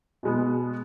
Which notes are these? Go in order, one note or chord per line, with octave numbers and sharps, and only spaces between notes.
B2 G#3 B3